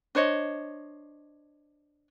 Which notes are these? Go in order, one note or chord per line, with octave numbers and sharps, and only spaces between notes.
D4 C5 C#5 D#5